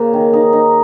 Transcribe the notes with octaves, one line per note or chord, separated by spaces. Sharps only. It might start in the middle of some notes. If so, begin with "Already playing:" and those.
Already playing: C#3 A#3
D#3
D#4
D#4